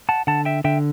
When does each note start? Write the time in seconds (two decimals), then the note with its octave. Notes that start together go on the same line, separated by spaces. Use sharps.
0.09 F#5 A5
0.27 D3 F#5 A5
0.45 E5 G5
0.64 D3 E5 G5